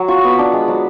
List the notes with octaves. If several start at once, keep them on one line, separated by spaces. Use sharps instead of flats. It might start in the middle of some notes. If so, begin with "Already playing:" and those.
Already playing: F#3
F4 C#6
C#6
B3 B5
D4
G#3
F#3